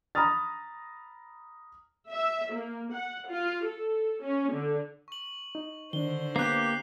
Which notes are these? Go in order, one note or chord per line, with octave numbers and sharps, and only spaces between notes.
A#5 B5 D#6 F6 A6
E5
A#3
F#5
F4
A4
C#4
D3
C#6 F#7
D#4
D3 D#3 D4 C5 G7
A#3 B3 G4 F#6 C7